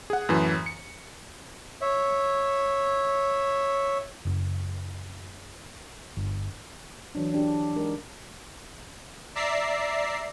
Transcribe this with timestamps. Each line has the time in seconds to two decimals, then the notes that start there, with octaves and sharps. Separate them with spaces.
0.10 G#4 F#5
0.29 F#2 A2 E3
0.66 C#7
1.81 C#5 E5
4.25 F#1
6.17 G1
7.15 E3 F#3 D4
7.34 D4 G4
7.76 G#3 D#4 A#4 D5
9.35 D5 E5 A#5 C7